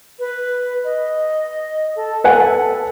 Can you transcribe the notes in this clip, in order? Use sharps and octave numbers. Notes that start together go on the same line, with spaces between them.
B4
D#5
A4
B4 F#5 G#5